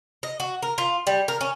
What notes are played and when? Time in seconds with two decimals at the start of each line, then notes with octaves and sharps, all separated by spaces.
0.23 D#5
0.40 F#4
0.62 A#4
0.78 F4
1.07 G3
1.28 A#4
1.41 C#4